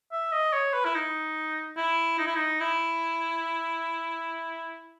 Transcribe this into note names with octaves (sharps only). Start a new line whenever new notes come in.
E5
D#5
C#5
B4
E4
D#4
E4
D#4
E4
D#4
E4